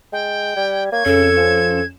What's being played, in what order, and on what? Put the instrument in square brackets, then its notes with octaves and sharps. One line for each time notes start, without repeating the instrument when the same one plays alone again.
[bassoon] G#3 [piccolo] G5
[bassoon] G3 [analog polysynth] G#6
[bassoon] A#3 [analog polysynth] C#5 [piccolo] G#6
[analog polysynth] F2 C#4 E7 [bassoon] C#3 [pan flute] A4
[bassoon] F3